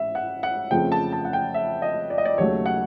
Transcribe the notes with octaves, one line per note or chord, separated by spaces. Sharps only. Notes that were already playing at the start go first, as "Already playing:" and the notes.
Already playing: A1 G#2 E5
F#5
F#5
F2 C#3 F3 A3 G5
A5
A5
F#5
G5
E5
D#5
D5
D#5
D5
D#2 C#3 F#3 A3 C#5
F#5